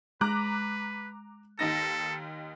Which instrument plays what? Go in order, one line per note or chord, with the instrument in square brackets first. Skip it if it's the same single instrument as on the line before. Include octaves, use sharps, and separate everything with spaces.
[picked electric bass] G#3 [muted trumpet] B4 [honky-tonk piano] A#5 D6 F#6
[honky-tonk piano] D#2 D#4 A#6 [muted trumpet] A4